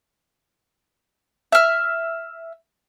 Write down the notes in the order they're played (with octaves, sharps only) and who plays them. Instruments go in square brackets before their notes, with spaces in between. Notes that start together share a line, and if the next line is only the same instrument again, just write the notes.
[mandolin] E5 F6